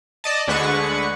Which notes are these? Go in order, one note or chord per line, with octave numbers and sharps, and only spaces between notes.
D5 D#5 A5
D2 D3 G#3 B4 F#5 C#6